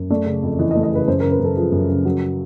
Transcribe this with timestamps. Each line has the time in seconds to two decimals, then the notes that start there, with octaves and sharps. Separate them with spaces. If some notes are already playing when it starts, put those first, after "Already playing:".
Already playing: F#2
0.10 A3 D5
0.26 C#3
0.43 F2
0.59 E3 D#5
0.71 D#5
0.75 A3
0.83 D#5
0.92 C#3 B4
1.08 F#2 C5
1.20 A#4
1.23 C#3
1.31 B4
1.40 F#2 A4
1.56 F3 G#4
1.72 F#2
1.89 C#3
2.05 F#3